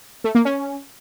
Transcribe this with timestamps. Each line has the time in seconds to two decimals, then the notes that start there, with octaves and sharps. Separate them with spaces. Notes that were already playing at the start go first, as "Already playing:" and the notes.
0.24 A3
0.35 A#3
0.45 C#4